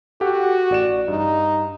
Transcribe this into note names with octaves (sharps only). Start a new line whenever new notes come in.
F#4 G4 A4 F#5
A1 D5 E7
G2 D#4